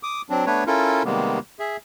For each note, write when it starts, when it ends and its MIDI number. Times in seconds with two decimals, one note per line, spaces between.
0.03 0.22 86
0.03 0.22 87
0.30 0.46 54
0.30 0.46 60
0.30 0.46 62
0.46 0.64 57
0.46 0.64 59
0.46 0.64 62
0.46 0.64 71
0.46 0.64 73
0.67 1.03 61
0.67 1.03 64
0.67 1.03 65
0.67 1.03 69
0.67 1.03 70
1.05 1.39 48
1.05 1.39 51
1.05 1.39 55
1.05 1.39 56
1.05 1.39 58
1.05 1.39 59
1.59 1.77 68
1.59 1.77 76